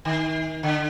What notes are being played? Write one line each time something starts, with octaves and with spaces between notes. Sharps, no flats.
D#3
D3